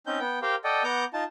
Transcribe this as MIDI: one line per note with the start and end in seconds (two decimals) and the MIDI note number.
0.07 0.19 60
0.07 0.19 61
0.07 0.19 63
0.07 0.19 91
0.20 0.39 59
0.20 0.39 79
0.42 0.55 67
0.42 0.55 70
0.42 0.55 72
0.42 0.55 77
0.42 0.55 79
0.64 0.83 69
0.64 0.83 74
0.64 0.83 75
0.64 0.83 78
0.64 0.83 79
0.84 1.05 59
0.84 1.05 78
0.84 1.05 82
0.84 1.05 86
0.84 1.05 91
1.13 1.24 63
1.13 1.24 65
1.13 1.24 81